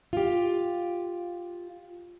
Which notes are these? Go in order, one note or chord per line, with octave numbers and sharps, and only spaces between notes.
F4 G4